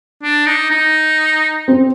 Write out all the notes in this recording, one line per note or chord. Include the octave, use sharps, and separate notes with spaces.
D4
D#4
D#4
C4